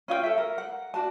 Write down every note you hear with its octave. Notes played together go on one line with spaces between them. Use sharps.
C#4 F4 D#5 G5
A4 E5
A#4
F#5
D4 F#4 A5